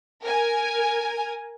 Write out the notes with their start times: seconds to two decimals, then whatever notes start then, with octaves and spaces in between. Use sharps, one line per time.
0.24 A#4 G#5